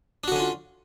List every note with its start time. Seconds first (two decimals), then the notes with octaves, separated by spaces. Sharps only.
0.24 D4
0.28 F#4
0.32 D3
0.36 C#4
0.40 F4